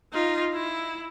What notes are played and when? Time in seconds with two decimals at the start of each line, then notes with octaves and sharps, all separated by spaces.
0.13 D#4 F4
0.53 E4